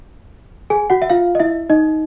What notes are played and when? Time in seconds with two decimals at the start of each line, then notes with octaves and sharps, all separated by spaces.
0.70 G#4 G#5
0.90 F#4 F#5
1.02 E5
1.10 F4 F5
1.35 D#5
1.39 E4 E5
1.70 D#4 D#5